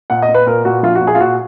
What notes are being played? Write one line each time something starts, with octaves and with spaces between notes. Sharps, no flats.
A#2 F#5
D#5
A#2
B4
A#2 A#4
A#2 F#4
A#1 F4
F#4
A#2
G#4
F4
A#2 F#4